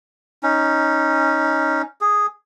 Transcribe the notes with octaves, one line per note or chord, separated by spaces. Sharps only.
C#4 D#4
G#4